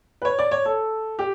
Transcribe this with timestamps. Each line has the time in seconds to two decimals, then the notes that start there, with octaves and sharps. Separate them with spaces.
0.22 B4
0.25 C#5
0.39 D5
0.51 C#5
0.65 A4
1.19 G4